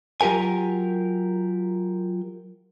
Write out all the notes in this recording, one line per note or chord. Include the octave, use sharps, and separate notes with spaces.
F#3 F4 G4 A#4 G#5